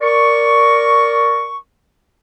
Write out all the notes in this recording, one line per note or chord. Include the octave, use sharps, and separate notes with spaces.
A#4 D5 C#6